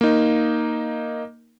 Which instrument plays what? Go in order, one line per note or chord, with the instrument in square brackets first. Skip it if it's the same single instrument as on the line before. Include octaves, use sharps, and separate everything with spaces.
[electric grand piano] A#3 D#4